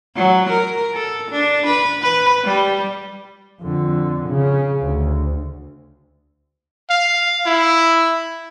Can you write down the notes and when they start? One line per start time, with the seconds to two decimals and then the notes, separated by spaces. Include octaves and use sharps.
0.16 F#3
0.50 A#4
0.94 A4
1.31 D4
1.66 B4
2.02 B4
2.44 G3
3.61 F2 D3
4.28 C#3
4.81 D2
6.90 F5
7.46 E4